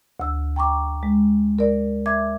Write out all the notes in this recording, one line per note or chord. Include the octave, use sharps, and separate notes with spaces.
D2 E6
G5 A#5 C#6 D6
G#3
A#4 D5
E5 D6 G#6